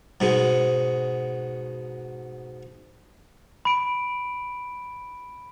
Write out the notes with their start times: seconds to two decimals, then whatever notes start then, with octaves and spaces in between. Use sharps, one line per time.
0.20 G#2 B2 G#3
3.65 B5 D7